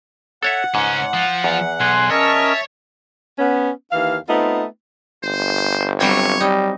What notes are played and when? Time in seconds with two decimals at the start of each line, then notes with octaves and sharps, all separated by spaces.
0.43 A4 C#5 E5 F#5
0.75 C#2 G#2 C#4
1.14 F3 F4
1.44 E2
1.80 B1 G#5 C6 F#6
2.10 C#4 A#4 C#5 D#5 E5 A5
3.39 B3 C#4
3.92 D#2 E3 F5
4.29 A3 B3 C4 D#4 F4
5.24 G1 C5
6.00 F#3 G3 C4 C#5
6.40 G3 D#4